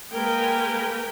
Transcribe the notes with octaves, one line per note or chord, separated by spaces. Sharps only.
G#3 A#3 A#4 B4 G5 G#5